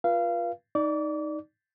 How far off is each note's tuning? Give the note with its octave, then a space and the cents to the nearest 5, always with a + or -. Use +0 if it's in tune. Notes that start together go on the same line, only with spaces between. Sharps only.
F4 +5 B4 -40 F5 -25
D#4 +0 D5 +0 D6 -35